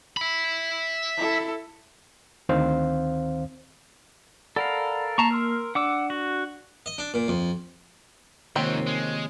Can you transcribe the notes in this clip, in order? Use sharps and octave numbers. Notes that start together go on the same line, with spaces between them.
E5 B5
E4 A4
D2 D#3 C4 C5 F5
A4 A#4 D5 F5 F#5 B5
A#3 A5 A#5 C#6 C7
A#4 C6 E6 F6
D4 D5 F#5 D6 E6
F#4
D#5
D4
A#2
F2
G#2 C3 D#3 F3 A#3 C4 C#5
G#3